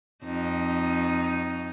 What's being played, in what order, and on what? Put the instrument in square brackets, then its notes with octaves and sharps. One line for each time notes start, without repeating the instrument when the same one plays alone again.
[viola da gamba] F2 D#4